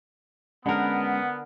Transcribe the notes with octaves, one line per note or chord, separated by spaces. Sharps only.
D3 G#3 B3 C#4 A#4 F#5